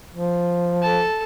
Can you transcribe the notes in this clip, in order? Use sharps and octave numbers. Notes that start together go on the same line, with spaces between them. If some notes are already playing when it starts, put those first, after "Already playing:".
F3
A4 A5